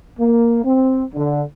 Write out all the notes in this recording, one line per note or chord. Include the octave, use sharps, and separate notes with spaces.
A#3
C4
D3